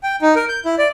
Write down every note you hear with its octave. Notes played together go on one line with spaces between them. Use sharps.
G5
D#4
A#4
G6
E4
D5